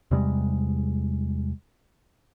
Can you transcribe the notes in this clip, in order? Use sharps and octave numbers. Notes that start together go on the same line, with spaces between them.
E2 C3 G3 G#3